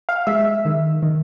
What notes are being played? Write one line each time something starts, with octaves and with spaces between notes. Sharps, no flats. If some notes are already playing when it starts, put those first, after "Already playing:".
F5
G#3 E5
D#3
D#3